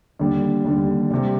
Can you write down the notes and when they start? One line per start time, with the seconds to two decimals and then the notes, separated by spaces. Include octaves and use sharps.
0.19 D#2 D3 G3
0.65 D#2 D3 G3
1.11 C3 G3